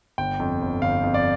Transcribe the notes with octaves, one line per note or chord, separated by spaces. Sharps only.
G1 G5
F2
G1
G1 F5
F2
D5